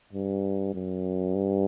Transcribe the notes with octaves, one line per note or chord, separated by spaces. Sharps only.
G2
F#2
G2